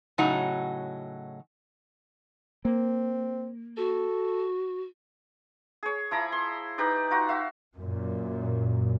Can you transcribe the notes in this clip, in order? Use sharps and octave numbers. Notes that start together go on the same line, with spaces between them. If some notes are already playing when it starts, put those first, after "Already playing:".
A2 C#3 F#3 D#4 F#4 A#5
A#3 C4
F#4 A4
G#4 C#5
F3 E4 A#5 B5
C6
D#4 G4 B4 D5
D#4 F4 F#4
F#4 E5 F5
F#2 A#2